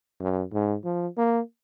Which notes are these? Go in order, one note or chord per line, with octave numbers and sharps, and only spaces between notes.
F#2
G#2
F3
A#3